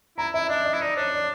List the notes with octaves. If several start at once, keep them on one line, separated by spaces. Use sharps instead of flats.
E4 A#5
E4 E5
D4 D#5
D#5
E4
D#4 D5
D4 C#5
D5